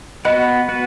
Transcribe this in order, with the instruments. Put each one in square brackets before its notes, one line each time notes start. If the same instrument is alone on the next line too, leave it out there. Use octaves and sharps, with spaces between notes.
[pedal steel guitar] B3 F#4 B4 [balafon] D#5 F#5
[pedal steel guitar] B3 F#4 B4